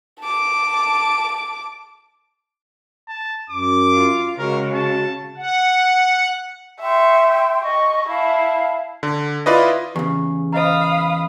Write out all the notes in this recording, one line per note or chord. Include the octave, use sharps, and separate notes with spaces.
A5 D6
A5
F#2 D6
F4
C#3 G#3 F#4 A#4
A5
F#5
E5 G5 C6 C#6
D#5 C#6
E4 F5 A5
D3
E4 F4 B4 D5 D#5
E2 C#3 G4
C5 D#5 F5 A#5 B5 D#6